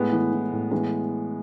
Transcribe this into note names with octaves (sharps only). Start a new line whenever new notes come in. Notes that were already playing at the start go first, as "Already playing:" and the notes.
Already playing: A2 G#3 B3
E3
E3
A2
E3 G#3 B3